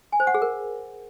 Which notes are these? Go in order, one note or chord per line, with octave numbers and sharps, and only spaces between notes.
G#5
C5
F#5
G#4
A#4